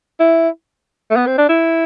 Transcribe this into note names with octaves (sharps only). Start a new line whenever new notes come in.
E4
A3
B3
C4
D4
E4